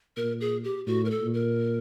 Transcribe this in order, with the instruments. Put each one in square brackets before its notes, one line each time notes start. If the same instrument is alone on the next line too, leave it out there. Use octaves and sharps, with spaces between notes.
[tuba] A#2 [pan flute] A#4
[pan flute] G#4
G4
[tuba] A2 [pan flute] F#4
[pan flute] A#4
A4
[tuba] A#2
[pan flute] A#4